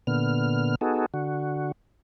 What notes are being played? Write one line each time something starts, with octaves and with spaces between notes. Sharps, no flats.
A#2 D3 B3 F6
B3 D#4 F#4 G#4 A4
D3 F#4